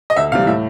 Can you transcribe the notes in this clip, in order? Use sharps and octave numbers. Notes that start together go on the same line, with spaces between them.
D#5
D2 E5
C3 E3 G3 F5
A2 E5